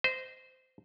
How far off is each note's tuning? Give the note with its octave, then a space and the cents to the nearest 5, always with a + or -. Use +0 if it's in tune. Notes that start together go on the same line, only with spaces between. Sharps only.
C5 -20 D#5 +0